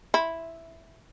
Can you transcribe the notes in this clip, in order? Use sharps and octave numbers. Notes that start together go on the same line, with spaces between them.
E4